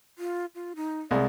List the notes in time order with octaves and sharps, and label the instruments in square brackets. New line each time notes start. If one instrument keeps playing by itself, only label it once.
[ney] F4
F4
D#4
[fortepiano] C2 G#3 [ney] D5